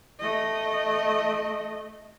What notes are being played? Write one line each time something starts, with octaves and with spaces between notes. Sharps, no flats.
A3 D#5